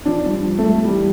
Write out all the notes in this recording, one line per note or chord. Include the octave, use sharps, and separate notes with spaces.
F3 D4
G2
F3
A3
G2
E3 G3